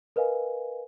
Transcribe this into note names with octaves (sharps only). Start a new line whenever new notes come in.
A#4 B4 D#5 F5 G#5